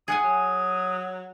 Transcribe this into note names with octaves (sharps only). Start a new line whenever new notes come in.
G#4 F#5 G#5 D#6
F#3